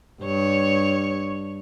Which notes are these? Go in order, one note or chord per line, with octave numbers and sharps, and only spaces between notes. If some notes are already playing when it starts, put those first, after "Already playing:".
G2 C#5